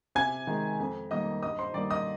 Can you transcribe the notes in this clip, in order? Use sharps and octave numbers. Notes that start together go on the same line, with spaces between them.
C3 G#5 G#6
D#3 G#3
F2
D#3 G3 A#3 D#5 D#6
G2 D#5 D#6
C5 C6
D#3 G3 A#3 D5 D6
D#5 D#6